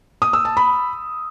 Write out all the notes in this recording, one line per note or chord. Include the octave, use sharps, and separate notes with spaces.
D#6
E6
A5
B5